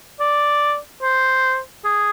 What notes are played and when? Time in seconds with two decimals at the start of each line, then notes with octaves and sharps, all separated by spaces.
0.20 D5
1.02 C5
1.85 G#4